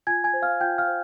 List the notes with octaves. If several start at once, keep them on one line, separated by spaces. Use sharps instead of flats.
F4 G#5 G#6
G#5 G#6
C5
F5 F6
F4 G5 G6
F5 F6
C5